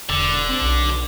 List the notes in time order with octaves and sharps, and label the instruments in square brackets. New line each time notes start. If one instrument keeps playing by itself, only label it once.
[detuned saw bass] E1 [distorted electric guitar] D3
[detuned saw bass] C4
B1